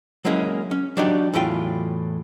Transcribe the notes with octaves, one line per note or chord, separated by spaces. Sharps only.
F#3 G#3 A#3 C#4 E4 G#4
C#4
F#3 D4 D#4 F#4 G4 D5
E2 A2 F#3 E4 F4 G5